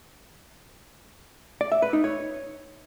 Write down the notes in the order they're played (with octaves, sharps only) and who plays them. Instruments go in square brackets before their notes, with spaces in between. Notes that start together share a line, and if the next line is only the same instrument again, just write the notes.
[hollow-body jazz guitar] D5
E5
B4
D#4
C#5